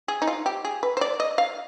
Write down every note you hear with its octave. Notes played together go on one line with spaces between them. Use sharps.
G#4
D#4
F4
G4
G#4
B4
C5
D5
D#5
F5